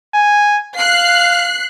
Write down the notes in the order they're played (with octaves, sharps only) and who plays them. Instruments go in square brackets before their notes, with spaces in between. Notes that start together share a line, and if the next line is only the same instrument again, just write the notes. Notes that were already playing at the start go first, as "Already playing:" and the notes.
[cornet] G#5
[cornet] F5 [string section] F#6 C7